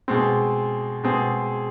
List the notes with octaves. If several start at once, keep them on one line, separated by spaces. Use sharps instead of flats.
B2 G#3 C4
B2 G#3 C4 G#4